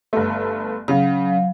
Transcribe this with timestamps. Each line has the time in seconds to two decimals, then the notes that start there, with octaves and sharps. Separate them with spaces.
0.13 G1 A3
0.88 C#3 F#3 F5